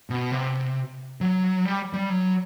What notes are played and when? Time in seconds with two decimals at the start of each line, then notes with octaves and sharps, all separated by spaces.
0.10 B2
0.32 C3
1.21 F#3
1.65 G3
1.93 G3
2.10 F#3